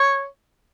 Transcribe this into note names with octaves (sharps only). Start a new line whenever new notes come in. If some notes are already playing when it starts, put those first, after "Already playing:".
Already playing: C#5